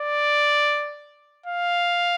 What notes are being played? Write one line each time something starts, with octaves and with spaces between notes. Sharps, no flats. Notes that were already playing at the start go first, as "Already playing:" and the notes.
Already playing: D5
F5